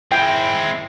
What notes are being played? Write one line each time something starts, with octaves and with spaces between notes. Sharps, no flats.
G#3 C4 E4 G5